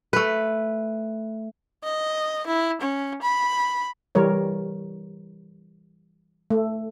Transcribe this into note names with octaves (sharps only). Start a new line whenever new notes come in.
A3 B4
D#5
E4
C#4
B5
E3 G3 A#4 C#5
A3